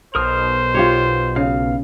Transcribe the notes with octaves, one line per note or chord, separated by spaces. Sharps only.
B1 B2 A#4 C5 D#6 F6
F4 G4 C#5
C#3 F5